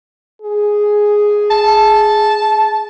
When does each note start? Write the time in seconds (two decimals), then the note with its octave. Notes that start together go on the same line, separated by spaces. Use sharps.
0.42 G#4
1.51 A5